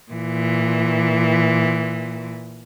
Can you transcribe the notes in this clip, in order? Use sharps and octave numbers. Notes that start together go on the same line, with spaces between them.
A#2 E3